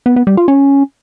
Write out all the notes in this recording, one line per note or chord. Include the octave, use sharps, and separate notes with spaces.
B3
B3
G3
F4
C#4